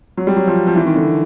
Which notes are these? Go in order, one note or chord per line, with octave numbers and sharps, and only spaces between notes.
F#3
G3
F#3
F3
F3
E3
D#3
D3